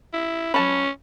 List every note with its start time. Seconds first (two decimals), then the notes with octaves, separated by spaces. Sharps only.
0.13 E4
0.54 F#3 C#4 A5 B5